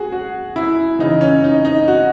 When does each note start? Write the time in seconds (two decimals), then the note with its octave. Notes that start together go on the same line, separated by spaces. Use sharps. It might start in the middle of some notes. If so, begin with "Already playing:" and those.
Already playing: F#4 G#4
0.12 F#4
0.56 E4
0.99 C#3 E3 D#4
1.21 C#4
1.44 D#4
1.65 D#4
1.88 F#4